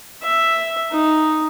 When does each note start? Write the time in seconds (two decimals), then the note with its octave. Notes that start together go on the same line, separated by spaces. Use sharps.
0.23 E5
0.92 D#4